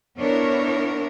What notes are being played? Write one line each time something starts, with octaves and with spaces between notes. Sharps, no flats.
B3 D4 E4 A#4 C#5